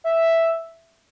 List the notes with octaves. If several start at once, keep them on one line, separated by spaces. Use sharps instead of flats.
E5